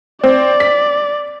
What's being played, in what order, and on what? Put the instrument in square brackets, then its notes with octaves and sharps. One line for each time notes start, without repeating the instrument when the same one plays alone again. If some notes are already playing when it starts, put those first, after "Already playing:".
[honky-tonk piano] C4 [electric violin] D5
[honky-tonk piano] B6